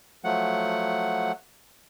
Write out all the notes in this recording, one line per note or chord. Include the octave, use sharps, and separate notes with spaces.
F3 F#3 A3 F#5